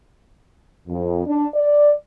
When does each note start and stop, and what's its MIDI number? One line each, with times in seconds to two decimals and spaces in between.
0.87 1.21 41
1.26 1.47 62
1.54 1.92 74